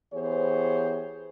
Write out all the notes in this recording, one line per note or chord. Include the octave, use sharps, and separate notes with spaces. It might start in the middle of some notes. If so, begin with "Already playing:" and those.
E3 B3 G4 G#4 C5 C#5